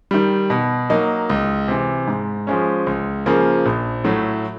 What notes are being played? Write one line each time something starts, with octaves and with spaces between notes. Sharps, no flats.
D#3 G3
B2
F#3 A#3 D#4
C#2
C3 E3
G#2
F3 G#3 C#4
C#2
C#3 F3 A#3
A#1
A2 F#3 A3